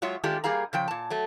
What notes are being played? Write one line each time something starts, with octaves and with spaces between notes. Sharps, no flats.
F#3 G#3 F4 C#5 E5
D#3 G#3 A3 D4 F4 G4
G3 A#3 G#4 F5 A#5
C#3 F3 G5
A#2 A5
F#3 A3